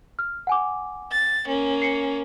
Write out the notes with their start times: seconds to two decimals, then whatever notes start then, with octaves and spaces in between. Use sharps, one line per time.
0.19 F6
0.47 F#5 G#5 D6
1.12 A6
1.46 A#3 C#4
1.82 C7 C#7